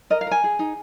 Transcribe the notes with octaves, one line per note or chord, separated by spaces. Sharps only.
A#4 D#5
F5
A#4 G#5
G#4
D#4